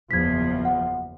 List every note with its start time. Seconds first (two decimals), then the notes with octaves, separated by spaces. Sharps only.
0.11 F#1 E2 F3 G#6 B6
0.65 F#5